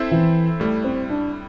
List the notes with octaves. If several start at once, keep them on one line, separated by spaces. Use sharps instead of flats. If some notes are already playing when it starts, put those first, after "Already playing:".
Already playing: C4 E4 A4 C5 E5
E3
A2 G3 A3 E4
C4
D4